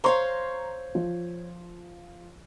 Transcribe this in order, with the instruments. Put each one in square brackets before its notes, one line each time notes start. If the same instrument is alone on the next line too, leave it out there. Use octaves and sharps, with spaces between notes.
[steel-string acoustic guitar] C5 C#5 F5 [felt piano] A#5 C6 C#6
[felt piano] F3